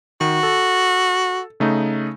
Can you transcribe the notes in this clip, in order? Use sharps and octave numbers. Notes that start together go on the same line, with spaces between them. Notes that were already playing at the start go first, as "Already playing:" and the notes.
D#3 F#4
A4
C#3 A3 D#4